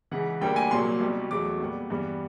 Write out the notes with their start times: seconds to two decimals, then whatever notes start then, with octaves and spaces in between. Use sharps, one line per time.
0.12 C#2 C#3 E3 F#5
0.41 D2 D3 G3 A#3 G5
0.56 G#5
0.71 C2 A#2 F#3 A#3 C6
1.00 C2 B2 G3
1.30 E2 B2 F#3 A3 D6
1.60 A#2 G3 B3
1.90 G2 E3 G3 B3